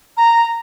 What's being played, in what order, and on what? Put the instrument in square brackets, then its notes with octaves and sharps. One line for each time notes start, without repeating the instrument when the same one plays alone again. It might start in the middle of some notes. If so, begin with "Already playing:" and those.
[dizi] A#5